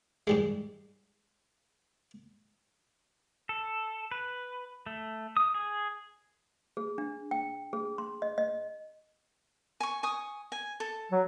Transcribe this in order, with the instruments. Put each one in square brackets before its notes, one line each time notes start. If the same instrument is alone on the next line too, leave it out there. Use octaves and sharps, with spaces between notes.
[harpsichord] G#2 G3 G#3
[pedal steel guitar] A4
B4
A3
D#6
G#4
[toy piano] G#4
D4
G5
G#4
C6
D#5
D#5
[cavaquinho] G#5 C#6
G#5 C#6 D#6
G#5
A4
[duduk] F#3